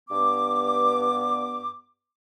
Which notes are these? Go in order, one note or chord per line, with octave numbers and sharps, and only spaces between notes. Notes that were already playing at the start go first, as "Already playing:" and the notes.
G2 B3 D6